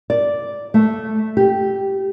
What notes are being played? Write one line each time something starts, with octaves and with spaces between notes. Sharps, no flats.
D5
A3
G4